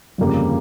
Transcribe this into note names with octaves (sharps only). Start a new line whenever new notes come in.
G1 F2 C#3 G3 A#3